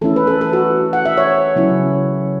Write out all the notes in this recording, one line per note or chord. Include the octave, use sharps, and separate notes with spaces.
E3 A3 C#4 E4 A4
B4
A4
A4
F#4
F#5
E5
C#5
C#3 F#3 C#4 E4